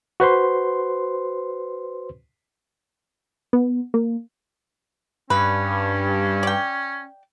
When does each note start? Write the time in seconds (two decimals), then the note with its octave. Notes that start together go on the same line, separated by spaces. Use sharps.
0.20 F#4 B4 C5 C6
3.53 B3
3.94 A#3
5.30 G2 C#4 B4
6.43 D5 G5